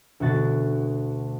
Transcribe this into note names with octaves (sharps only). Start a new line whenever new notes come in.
D2 B2 F#4 A6